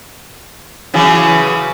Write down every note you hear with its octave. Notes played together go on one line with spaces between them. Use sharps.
C#3 E3 F#3